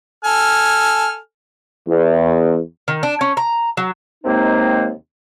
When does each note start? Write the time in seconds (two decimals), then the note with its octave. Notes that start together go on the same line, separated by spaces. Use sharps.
0.25 A4 G#5 F6
1.87 E2
2.88 D#3
3.03 D4
3.21 C#4
3.37 A#5
3.77 F#3
4.24 D#2 C3 G#3 A#3 C4 D#4